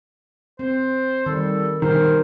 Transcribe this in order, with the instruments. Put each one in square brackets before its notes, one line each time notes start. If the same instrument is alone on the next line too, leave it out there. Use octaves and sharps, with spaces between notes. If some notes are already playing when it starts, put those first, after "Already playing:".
[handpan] C4 [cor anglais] C5
[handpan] D#3 [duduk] G3 [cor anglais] A4
[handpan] B2 G3 G#4 [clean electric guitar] D#3 [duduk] A#4 [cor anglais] C5